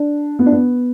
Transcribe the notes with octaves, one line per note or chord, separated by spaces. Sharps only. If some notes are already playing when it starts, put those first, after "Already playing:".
Already playing: D4
B3
D4
B3